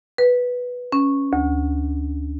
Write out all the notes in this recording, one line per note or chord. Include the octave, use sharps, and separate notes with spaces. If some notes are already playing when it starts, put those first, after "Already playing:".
B4
C#4
D2